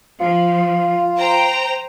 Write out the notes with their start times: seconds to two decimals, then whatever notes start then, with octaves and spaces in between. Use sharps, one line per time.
0.20 F3 F4
1.16 C5 G5 A#5